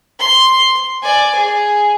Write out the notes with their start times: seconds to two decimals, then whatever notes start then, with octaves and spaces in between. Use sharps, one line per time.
0.20 C6
1.03 D5 G#5
1.35 G#4